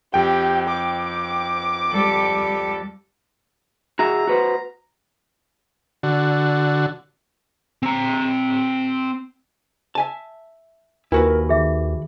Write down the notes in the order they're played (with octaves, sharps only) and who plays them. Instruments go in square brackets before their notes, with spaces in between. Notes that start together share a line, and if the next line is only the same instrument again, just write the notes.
[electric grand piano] F2 G5 [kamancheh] G4
[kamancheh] D6
[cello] G3 A4
[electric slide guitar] F#4 G#4 E5 [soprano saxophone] A#5
[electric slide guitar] F#4 B4 C5
[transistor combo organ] D3 F#4
[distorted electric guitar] C4 A#5
[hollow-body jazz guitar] E5 G#5 A5
[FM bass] D#2 [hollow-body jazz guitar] E4 F#4 B4 [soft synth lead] A#4 [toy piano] G#5
[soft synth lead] D#3 [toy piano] G#4 E5 D6